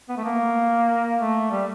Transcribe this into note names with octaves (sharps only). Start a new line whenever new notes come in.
B3
A3
A#3
A3
G3